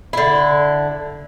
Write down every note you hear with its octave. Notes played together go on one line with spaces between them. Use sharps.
D3 E4